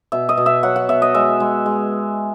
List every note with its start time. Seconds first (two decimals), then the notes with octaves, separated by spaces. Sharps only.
0.12 B2 E5
0.29 D#5
0.37 B2
0.46 E5
0.63 F#3 F#5
0.76 F#5
0.89 B2 E5
1.02 D#5
1.14 G#3 E5
1.40 G#3
1.66 G#3